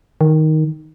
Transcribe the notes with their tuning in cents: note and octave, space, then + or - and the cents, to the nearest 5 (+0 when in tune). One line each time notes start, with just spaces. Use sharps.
D#3 +5